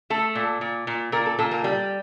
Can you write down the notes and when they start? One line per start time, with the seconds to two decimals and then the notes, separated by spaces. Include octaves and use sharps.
0.10 A3 A4
0.35 A#2
0.61 A#2
0.87 A#2
1.12 A#2 A#4
1.26 A4
1.39 A#2 A4
1.51 A#3
1.64 G3